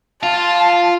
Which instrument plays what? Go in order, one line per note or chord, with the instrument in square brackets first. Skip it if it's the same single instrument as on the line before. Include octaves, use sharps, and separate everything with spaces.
[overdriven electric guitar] F4 [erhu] A5